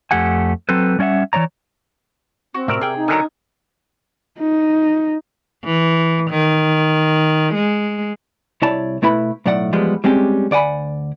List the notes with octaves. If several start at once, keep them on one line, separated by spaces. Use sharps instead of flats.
F2 A3 G4 F#5 G#5
F#3 C4 A4 B4
G3 C#4 D5 E5 F#5
E3 A#3 C#5 D5 A#5
C4 F#4
A2 C3 A#4 D5 E5
C3 G#4 G5
D#4
D3 D#3 F#3 G#5 A#5
D#4
E3
D#3
G#3
C2 E4 C#5 D5 A5
B2 A3 E4 B4 B5
B1 A2 F#3 D5 F#5
E2 F3 G3 G#3 B3
G3 G#3 C4 C#4 G4
D2 D5 F#5 G#5 B5